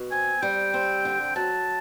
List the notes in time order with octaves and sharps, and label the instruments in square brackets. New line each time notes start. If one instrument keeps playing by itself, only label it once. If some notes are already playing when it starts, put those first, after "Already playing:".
Already playing: [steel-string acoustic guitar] B2
[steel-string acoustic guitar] C4 [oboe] G#5
[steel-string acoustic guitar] G3 [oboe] G5
[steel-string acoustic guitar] C4
D3
[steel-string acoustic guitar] F#3 [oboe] A5